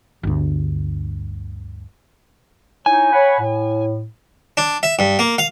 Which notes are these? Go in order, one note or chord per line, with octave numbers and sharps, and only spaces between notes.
G1 D2
D#4 E4 C#5 G#5
C#5 F#5 B5
A2
D4
E5
G2
A#3
F5